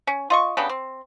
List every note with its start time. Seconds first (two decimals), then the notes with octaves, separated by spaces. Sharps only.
0.07 C#4
0.30 F4 D#5 C#6
0.57 C#3 B3 D4 G4
0.69 C4